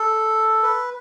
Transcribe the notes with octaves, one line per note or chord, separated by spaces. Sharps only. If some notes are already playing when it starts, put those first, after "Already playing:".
Already playing: A4
B4